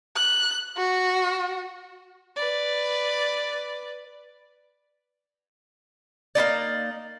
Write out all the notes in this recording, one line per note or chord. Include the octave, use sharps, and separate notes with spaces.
F#6
F#4
B4 D5
A#3 B3 D#4 D5